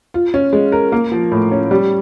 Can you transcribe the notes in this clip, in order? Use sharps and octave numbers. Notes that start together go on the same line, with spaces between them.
F4
C#4
G#3
A#4
A#3
F3
A2
C#4
G3